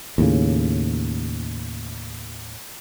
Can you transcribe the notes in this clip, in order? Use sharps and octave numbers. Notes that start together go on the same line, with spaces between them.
D#2 A2 C#3